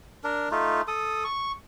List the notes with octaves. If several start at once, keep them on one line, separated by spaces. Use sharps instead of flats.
D4 A#4
A3 D#4 F4
A4 D#6
C#6